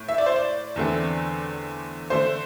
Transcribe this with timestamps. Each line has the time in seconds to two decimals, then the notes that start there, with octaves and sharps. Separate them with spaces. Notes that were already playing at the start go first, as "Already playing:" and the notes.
Already playing: A2
0.08 E5
0.18 D5
0.26 C5
0.36 D5
0.76 E2 D3 A3 C4
2.10 D3 A3 D4 C5